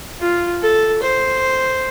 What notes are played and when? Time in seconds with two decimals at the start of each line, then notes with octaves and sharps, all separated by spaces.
0.20 F4
0.62 A4
1.02 C5